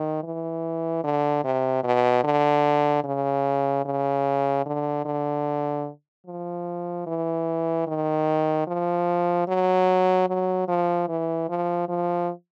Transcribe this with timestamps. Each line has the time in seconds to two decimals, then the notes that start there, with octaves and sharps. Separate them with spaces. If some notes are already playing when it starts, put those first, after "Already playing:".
Already playing: D#3
0.23 E3
1.04 D3
1.44 C3
1.83 B2
2.24 D3
3.04 C#3
3.85 C#3
4.66 D3
5.05 D3
6.26 F3
7.07 E3
7.87 D#3
8.67 F3
9.48 F#3
10.28 F#3
10.68 F3
11.08 E3
11.49 F3
11.89 F3